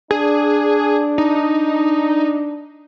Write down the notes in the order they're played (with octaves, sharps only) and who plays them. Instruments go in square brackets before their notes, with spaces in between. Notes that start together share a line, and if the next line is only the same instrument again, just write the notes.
[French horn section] D4 [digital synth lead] G#4
[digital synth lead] D#4